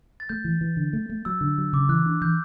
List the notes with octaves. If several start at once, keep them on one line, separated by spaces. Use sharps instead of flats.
A6
A3 G6
E3
E3
D3
A3
A3
F#3 E6
D3
F#3
C#3 D6
E3 F#6
D4
E3 G6